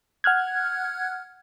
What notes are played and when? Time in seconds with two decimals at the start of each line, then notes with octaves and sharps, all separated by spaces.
0.24 F#5 F6 F#6 G#6